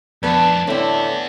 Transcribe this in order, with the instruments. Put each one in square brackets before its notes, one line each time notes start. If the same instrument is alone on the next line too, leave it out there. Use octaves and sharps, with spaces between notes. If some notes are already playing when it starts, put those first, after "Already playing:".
[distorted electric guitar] F2 D4 [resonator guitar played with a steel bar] A3 B4 [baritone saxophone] B3 [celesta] D5
[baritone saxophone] A2 [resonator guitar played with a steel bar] D3 C4 [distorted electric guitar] B3 E5 [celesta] C#5 D5